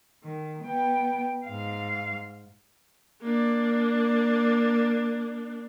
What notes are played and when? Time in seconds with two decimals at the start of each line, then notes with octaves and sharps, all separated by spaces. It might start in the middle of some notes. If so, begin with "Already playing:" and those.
0.23 D#3
0.64 B3 G5
1.46 G#2 F5
3.22 A#3 D4